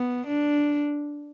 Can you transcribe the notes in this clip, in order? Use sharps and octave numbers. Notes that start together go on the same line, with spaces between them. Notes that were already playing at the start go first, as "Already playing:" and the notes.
Already playing: B3
D4